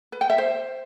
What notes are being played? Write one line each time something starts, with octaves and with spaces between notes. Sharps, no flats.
B4
G5
E5
C5